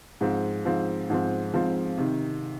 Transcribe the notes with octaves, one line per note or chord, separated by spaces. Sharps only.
G#2 F3 C4
G#2 F3 C4
G#2 F3 C4
G#2 F3 C4
C3 D#3